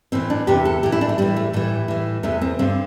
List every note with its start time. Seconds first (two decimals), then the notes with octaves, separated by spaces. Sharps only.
0.12 A2 E3 C4
0.30 D4
0.47 E2 C3 E3 G4
0.65 A4
0.83 A2 E3 G4
0.92 E4
1.01 D4
1.09 A3
1.18 A2 E3 G3
1.36 A3
1.53 A2 E3 G3
1.88 A2 E3
2.23 E2 C3 E3 A3
2.41 C4
2.59 G2 D3 C4